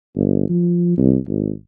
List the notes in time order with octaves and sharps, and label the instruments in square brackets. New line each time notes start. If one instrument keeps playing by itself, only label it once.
[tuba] G1
F3
C2
G#1